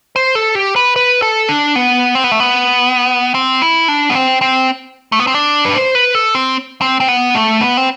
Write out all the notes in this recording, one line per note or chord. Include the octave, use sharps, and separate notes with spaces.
C5
A4
G4
B4
B4
A4
D4
B3
C4
B3
A3
B3
C4
E4
D4
B3
C4
C4
A3
B3
C4
D4
B4
C5
B4
A4
C4
C4
C4
B3
A3
B3
C4